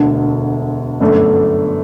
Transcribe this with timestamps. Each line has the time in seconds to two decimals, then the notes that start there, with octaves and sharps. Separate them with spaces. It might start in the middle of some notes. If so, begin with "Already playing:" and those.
Already playing: E1 D2 D3
1.00 G1 F#2 D3 A3 D4